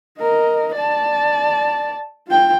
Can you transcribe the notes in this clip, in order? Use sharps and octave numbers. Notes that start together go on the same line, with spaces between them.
A#4 D#5
D5 A5
F4 G5